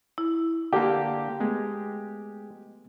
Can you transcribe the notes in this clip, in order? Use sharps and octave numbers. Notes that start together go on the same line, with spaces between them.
E4
D3 A#3 G4
G#3 A3 B3